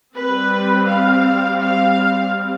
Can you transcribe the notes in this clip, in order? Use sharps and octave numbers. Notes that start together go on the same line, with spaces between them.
G3 C4 B4
F5
F5